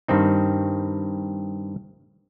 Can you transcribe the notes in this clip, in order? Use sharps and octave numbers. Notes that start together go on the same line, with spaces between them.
G2 D#3 C4 D#4